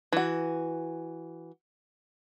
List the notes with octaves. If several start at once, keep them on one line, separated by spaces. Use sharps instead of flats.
E3 F#4